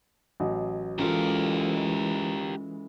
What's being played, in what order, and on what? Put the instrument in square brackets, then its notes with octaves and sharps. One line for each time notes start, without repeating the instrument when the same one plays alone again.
[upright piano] A1 F#3 D#5
[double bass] E3 G#3 [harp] C#4 F4 A4 [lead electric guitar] G4 A#4